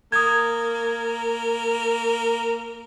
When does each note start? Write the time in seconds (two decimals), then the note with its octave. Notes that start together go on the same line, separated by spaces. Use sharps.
0.12 A#3 D#6 G#6